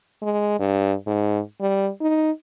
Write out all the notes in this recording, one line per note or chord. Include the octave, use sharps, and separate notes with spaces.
G#3
G2
G#2
G3
D#4